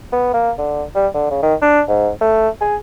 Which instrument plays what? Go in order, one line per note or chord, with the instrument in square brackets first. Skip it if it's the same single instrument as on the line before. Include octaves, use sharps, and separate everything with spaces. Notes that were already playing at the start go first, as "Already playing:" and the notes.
[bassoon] B3
A#3
D3
G3
D3
C#3
D#3
D4
G#2
A3
G#4